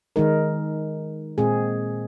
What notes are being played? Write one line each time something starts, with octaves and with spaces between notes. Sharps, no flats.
D#3 G#3 D#4 A#4
A#2 G#3 C4 G#4